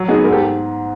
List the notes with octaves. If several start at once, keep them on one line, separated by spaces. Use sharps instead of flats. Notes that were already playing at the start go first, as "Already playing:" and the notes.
Already playing: F#3
B3 D#4 F#4 G#4
G#2 G#4 A#4
G4 A4